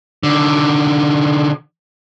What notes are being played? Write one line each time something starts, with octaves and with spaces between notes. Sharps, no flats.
D3 D#3